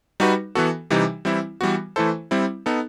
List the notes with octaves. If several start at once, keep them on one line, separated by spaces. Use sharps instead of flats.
G3 D#4 F#4 B4
E3 B3 F#4 A4
C3 E3 G3 D#4 G4
E3 G3 C4 E4
E3 G3 B3 F#4
E3 A3 E4 A4 C5
G3 C4 E4
B3 D#4 A4